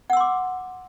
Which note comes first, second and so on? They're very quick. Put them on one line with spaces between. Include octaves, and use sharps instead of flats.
F#5 E6 C6 D6